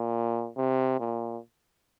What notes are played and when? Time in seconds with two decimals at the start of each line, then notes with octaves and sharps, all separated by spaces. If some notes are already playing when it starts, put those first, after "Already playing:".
Already playing: A#2
0.57 C3
1.00 A#2